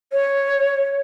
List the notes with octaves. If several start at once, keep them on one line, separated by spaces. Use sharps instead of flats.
C#5